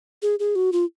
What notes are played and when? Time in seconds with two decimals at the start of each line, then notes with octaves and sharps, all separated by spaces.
0.22 G#4
0.39 G#4
0.56 F#4
0.73 F4